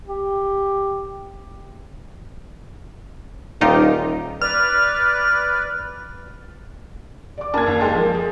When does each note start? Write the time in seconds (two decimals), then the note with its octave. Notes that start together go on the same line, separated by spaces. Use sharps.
0.07 G4
3.61 D#1 D#4 F4 G4
4.42 B4 D5 F6
7.38 D5 D6
7.54 F#2 A#3 D5 A5 G#6
7.66 D#2
7.81 G#3 G4 A4
7.94 F3 A#3
8.14 G#4